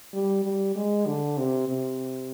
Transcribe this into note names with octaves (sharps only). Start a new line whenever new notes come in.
G3
G3
G#3
D3
C3
C3